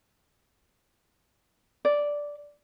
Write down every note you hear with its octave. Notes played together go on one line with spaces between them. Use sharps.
D5